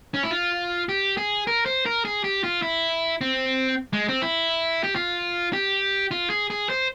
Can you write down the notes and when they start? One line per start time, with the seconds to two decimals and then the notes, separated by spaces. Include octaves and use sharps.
0.14 C#4
0.23 E4
0.31 F4
0.89 G4
1.17 G#4
1.47 A#4
1.66 C5
1.86 A#4
2.05 G#4
2.24 G4
2.44 F4
2.62 E4
3.21 C4
3.93 G#3
4.08 C4
4.22 E4
4.84 G4
4.95 F4
5.53 G4
6.11 F4
6.30 G#4
6.50 G#4
6.70 C5